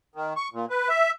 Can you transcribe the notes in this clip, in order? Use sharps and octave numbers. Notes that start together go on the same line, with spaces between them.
D#3
C#6
A#2
B4
E5